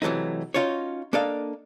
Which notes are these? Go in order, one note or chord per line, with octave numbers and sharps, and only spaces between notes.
C3 E3 F#3 A3 D#4
C#4 D#4 F4 F#4 C#5
A#3 D4 A4 D#5 F5